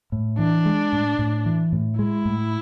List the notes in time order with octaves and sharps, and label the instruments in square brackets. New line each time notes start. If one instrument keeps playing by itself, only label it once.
[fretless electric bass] A2
[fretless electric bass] E3 [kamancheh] D4
[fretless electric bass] G#3
A2
A2
E3
A2
[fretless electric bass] G#3 [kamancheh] E4
[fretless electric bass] A2